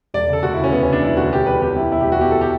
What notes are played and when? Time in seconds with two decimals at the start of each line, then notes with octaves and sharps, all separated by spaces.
0.14 E1 D5
0.28 C#3 A4
0.43 D2 F#4
0.54 E4
0.58 C#3
0.64 C#4
0.73 E1 B3
0.83 C#4
0.88 C#3 D4
1.02 E1 E4
1.17 D2 F#4
1.32 B2 G4
1.47 E2 B4
1.62 E2 G4
1.76 E2 E4
1.92 B2 E4
2.01 G4
2.07 E2
2.12 F#4
2.21 B2 G4
2.31 A4
2.41 G4